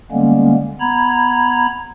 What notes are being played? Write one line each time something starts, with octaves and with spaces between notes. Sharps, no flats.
D3 G3 G#3 A#3 B3 C#4
B3 A#5 B5 G#6